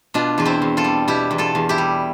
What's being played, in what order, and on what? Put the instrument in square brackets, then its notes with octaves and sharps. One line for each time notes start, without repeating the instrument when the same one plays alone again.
[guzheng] B2 D4 F4
E2 F4
C4 E4
E2
F4 A4
G3
B2 E4 G4
E2
F4 A4
E2
E4 G4
G3